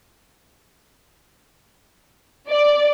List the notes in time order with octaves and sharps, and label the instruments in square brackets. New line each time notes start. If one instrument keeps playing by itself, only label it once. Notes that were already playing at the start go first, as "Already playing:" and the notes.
[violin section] D5